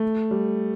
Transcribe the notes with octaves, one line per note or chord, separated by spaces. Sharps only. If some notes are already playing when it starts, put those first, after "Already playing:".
Already playing: A3
G3